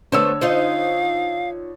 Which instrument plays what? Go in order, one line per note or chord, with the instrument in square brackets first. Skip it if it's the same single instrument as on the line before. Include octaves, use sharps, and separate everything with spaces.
[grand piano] D3 C#5 E6 [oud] A3 B3 C5
[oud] D#4 F4 C5 [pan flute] F5